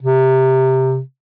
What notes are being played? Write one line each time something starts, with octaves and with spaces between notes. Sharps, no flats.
C3